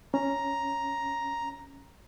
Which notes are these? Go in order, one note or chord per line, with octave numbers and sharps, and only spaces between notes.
C#4 A#5